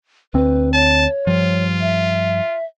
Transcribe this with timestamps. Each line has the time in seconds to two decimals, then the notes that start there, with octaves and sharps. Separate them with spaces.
0.34 D2 C4 B4
0.73 C#5 A5
1.27 G2 F3 F4
1.81 E5